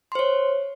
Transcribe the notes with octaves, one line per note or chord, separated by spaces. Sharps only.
C5 C#5 C6